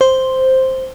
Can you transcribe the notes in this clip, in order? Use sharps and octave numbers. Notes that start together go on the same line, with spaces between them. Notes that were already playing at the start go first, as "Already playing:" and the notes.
C5